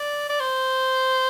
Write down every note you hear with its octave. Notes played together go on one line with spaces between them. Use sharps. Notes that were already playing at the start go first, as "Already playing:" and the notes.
Already playing: D5
D5
C5